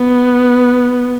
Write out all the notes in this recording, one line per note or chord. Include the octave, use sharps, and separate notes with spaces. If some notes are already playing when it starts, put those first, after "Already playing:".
Already playing: B3